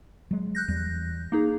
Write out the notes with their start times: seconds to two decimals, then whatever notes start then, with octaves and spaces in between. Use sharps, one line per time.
0.31 F#3 G#3
0.55 F#6 G6 A#6
0.68 E2 G3
1.32 A#3 D#4 G#4